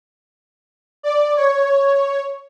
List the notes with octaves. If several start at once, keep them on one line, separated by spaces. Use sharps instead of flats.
D5
C#5